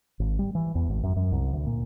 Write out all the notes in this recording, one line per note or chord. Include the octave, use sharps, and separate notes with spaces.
G#1
G3
E3
E2
G#1
F#2
F#2
C2
D2
A#2